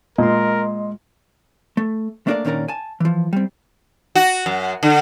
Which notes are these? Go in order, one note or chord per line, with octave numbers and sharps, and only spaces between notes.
A#2 G#3 A#4 D#5 C6
A3
A3 A#3 D4 G#4 A#4 D5
A#2 D#3 C#4 D4 A#4 A#5
G#5 A5
E3 F3
G3 C4
F#4
F#2
D3